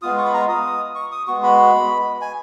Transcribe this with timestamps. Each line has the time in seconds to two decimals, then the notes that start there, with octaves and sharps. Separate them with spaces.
0.02 G#3 B3 F4 D#6
0.18 C#6
0.25 B5
0.34 A#5
0.49 D#6
0.95 C#6
1.12 D#6
1.27 G#3 B3 F#4 C#6
1.43 B5
2.21 G#5